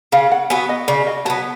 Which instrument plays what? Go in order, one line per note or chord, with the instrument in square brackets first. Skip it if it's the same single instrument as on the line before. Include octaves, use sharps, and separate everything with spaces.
[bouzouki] C#3 [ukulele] F5
[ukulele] F#5
[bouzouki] F#3 B3 [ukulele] G#5
[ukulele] D#5
[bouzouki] C#3 [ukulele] D5
[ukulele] D#5
[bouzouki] F#3 B3 [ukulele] A5